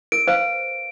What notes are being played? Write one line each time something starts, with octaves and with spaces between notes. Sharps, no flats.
A#4 D7
B4 C5 F5